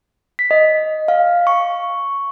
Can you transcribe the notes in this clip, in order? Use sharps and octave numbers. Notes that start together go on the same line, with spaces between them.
B6
D#5
F5
C#6